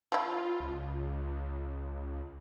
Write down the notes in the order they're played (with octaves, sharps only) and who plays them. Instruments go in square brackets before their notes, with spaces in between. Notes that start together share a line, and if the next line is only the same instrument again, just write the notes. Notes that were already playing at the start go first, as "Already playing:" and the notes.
[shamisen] F3 E4 [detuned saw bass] F4
[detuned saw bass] C#2